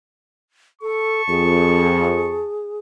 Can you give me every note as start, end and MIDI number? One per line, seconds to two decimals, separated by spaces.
0.82 1.22 69
0.82 2.51 81
0.82 2.51 85
1.30 2.42 41
1.30 2.79 68